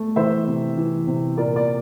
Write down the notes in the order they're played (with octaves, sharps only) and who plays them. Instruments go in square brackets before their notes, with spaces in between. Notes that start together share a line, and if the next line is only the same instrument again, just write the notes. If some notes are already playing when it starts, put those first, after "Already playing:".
Already playing: [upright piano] A3
E3 C5 E5
C3
E3
C3
A#2 A#4 D5
D5